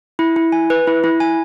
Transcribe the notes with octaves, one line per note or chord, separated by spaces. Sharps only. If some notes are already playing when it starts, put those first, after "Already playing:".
E4
E4
G#5
B4
E4
E4
G#5